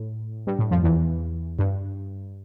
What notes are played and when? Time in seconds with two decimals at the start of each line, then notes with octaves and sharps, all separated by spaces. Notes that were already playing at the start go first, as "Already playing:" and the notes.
Already playing: A2
0.47 G2
0.59 A2
0.71 F2 F3
0.83 E2 E3
1.59 G2